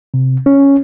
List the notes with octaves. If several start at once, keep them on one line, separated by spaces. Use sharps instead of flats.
C3
C#4